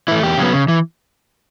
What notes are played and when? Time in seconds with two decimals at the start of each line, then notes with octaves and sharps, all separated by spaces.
0.08 E3 A3 E4
0.23 E2 G4
0.38 C#3 F#3 B3
0.53 C#3
0.68 E3